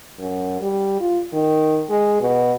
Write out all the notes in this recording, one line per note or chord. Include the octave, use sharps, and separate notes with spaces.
F#2
G3
F4
D#3
G#3
B2